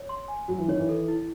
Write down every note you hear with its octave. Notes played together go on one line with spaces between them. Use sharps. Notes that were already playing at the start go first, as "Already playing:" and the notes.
Already playing: C#5
C6
G#5
F#3 F#4
E3
D#3 C#5
E3
A4
E4